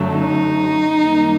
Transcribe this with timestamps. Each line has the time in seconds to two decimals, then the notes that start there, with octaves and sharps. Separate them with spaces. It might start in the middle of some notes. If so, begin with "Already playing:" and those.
Already playing: F#2 D3 F#3 A3
0.14 D#4
0.99 F#2 D#3 G3 A#3